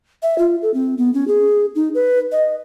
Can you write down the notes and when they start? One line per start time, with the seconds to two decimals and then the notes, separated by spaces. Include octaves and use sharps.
0.23 E5
0.38 F4
0.62 A4
0.74 C4
0.98 B3
1.14 C#4
1.28 G#4
1.75 D#4
1.94 B4
2.32 D#5